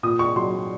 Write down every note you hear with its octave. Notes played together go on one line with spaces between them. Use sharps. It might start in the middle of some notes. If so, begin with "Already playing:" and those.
A#2 D#6
C#6
F#3 C6